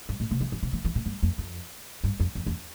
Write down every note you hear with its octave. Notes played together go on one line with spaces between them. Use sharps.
G2
A2
C3
E3
E3
C3
E3
E3
A2
G2
F2
F2
G2
F2
F2
E2